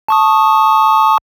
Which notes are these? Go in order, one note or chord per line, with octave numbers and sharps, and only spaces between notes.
A5 C#6 D#6